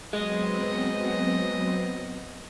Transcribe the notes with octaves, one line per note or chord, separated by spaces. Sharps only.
F#3 G#3 B3 C4 D#5